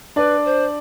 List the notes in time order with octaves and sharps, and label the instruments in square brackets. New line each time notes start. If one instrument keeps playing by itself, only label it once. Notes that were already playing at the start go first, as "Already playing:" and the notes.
[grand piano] D4 D5 [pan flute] B4
[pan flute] C5